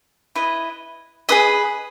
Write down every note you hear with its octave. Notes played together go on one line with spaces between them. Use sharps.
E4 B4 D#5
G#4 B4 D#5 D#6